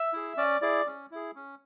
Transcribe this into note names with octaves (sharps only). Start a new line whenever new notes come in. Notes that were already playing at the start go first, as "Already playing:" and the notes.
Already playing: E5 E6
E4 G#4
C#4 D5 D6
E4 G#4 D5 D6
C#4
E4 G#4
C#4